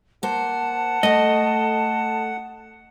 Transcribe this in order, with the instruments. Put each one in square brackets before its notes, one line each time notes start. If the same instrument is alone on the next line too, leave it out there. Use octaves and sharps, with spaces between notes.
[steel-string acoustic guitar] A#3 C5 [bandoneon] F#5 [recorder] A5
[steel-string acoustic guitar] A3 A4 [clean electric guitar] D#5